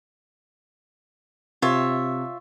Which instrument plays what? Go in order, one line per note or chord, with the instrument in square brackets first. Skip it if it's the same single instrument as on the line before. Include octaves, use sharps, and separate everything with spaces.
[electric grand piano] C3 [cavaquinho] F4 C#5 E5